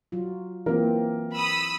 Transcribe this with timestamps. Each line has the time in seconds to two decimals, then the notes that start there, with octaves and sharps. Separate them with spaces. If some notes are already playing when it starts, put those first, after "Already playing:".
0.12 F#3 F4
0.66 E3 A#3 C4 F4 A#4
1.35 B5 D#6 E6